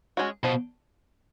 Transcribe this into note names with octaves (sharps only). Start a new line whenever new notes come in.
G#3 C#4 F#4
B2 F3